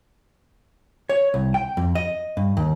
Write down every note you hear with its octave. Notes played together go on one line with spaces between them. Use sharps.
C#5
C2
G5
F2
D#5
G2
D#2